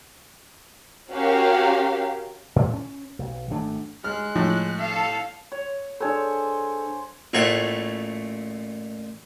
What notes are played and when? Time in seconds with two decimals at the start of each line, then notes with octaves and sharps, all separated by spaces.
1.12 C#4 F#4 G4 A#4 F5
2.56 A2
2.73 C#4
3.19 B1
3.50 G#1 F#2 A3 D4
4.04 G#3 F6 F#6
4.35 A2 F3
4.79 A4 F5
5.52 C#5
6.01 D4 G#4 A4 C5 C#5 G#5
7.33 A1 A#2 A3 C#5 F#5